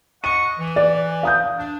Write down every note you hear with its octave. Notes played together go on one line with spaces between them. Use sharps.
D#5 F#5 C#6 D#7
E3
D5
F5 D#6 G6
D4